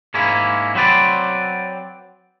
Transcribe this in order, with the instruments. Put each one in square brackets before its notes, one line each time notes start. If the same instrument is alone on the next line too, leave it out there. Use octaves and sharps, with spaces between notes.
[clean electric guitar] G#2 G#3 A#3 C#4 E4
F#3 C4 B4 D5